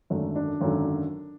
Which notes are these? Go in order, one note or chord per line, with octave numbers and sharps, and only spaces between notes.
G#1 F#2 D3 F#3 A3
D4
G#1 F#2 D3 F#3